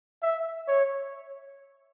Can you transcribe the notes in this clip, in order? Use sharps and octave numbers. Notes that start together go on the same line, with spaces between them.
E5
C#5